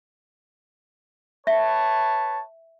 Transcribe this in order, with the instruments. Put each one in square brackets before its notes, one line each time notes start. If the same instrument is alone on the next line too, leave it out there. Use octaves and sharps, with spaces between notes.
[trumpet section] B4 C#5 A5 [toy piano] E5